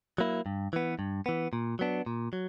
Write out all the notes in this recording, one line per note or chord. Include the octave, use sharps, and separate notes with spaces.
F#3 A#3 E4
G2
E3 B3
G2
E3 B3
A#2
F#3 B3 D4
A#2
F#3